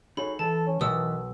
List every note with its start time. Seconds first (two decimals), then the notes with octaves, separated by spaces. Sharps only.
0.17 F#3 D#4 G#4 A4 B5
0.39 E3 A4 A5
0.66 C#4
0.81 B1 D#3 E3 B4 D#6 E6